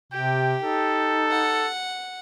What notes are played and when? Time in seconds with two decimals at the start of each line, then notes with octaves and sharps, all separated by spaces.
0.13 C3 G4 G5
0.62 D#4 A4
1.31 F#5